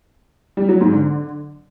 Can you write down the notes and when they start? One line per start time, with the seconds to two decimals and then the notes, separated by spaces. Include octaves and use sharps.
0.57 G3
0.69 F#3
0.81 G#2
0.92 D3